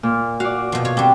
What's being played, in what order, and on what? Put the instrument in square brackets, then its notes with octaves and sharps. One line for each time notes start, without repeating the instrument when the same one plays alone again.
[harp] A#2
[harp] F#4 D5 [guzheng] F5
[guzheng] B2 F3
F4 C#5
[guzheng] G3 C4 [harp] D4